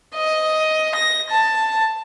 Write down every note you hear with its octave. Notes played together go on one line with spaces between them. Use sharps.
D#5
A#6
A5